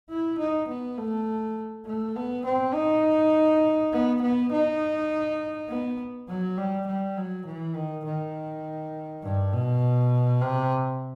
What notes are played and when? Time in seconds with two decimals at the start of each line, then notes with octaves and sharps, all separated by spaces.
0.10 E4
0.39 D#4
0.68 B3
0.98 A3
1.86 A3
2.16 B3
2.45 C4
2.74 D#4
3.93 B3
4.22 B3
4.52 D#4
5.69 B3
6.29 F#3
6.58 G3
6.87 G3
7.17 F#3
7.46 E3
7.75 D#3
8.05 D#3
9.23 G2
9.52 B2
10.42 C3